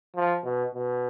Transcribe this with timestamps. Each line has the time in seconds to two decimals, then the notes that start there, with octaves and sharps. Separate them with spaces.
0.16 F3
0.44 B2
0.74 B2